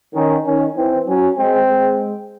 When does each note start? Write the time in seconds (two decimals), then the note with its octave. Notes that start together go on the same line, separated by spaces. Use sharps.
0.15 D#3 C#4
0.45 D#3 C#4
0.76 E3 C4
1.07 F#3 C#4
1.38 G#3 C4
1.70 G#3